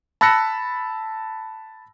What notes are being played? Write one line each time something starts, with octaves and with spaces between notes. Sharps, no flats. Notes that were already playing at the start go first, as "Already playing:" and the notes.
A5 B5 E6 F#6 A#6 C#7